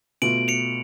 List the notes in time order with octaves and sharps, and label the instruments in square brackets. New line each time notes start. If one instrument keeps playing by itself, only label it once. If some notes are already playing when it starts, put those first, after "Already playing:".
[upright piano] B2 A3 F4 [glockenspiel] D7 F#7
[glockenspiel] C#7 F7